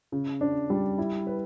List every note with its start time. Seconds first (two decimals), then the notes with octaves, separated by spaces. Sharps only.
0.12 C#3
0.41 D4
0.70 G3
0.98 E4
1.27 B4